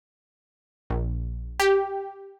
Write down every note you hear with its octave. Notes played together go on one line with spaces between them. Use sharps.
A#1
G4